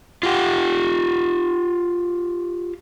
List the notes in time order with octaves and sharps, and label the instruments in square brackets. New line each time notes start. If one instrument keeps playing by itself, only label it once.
[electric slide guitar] F4 G4 F#5